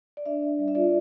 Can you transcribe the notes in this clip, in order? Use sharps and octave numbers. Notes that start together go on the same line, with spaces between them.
D5
D4 E5
D4
G3
E5
F4 D5